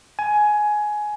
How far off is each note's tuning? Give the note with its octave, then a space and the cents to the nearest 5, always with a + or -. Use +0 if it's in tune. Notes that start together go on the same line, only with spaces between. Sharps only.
G#5 +15